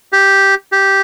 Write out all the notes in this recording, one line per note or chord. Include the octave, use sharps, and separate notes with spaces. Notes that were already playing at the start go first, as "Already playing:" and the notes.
G4
G4